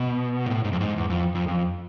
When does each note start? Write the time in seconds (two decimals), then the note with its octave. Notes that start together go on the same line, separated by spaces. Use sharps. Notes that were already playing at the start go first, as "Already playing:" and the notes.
Already playing: B2
0.46 A2
0.64 G#2
0.73 F2
0.80 G#2
0.98 E2
1.10 F2
1.35 F2
1.48 F2